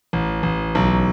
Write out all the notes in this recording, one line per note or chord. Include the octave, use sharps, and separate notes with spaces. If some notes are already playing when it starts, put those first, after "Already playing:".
A1
A1
B1